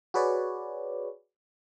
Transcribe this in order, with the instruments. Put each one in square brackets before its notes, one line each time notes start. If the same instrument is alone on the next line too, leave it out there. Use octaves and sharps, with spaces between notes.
[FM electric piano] F#4 G#4 B4 C#5 D5